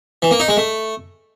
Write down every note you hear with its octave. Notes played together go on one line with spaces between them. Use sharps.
E3
A#3
D#4
G#3
A3